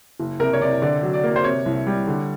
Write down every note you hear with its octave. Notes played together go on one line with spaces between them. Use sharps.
F#1
C3 A#4
C#5
C3 D5
D3 D5
F#3
D5
A#3
C5
C3 C#5
C2
G3
D3